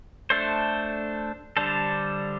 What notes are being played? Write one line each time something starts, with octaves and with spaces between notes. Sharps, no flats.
A3 D4 A4 C5
D3 G3 D4 A4 C5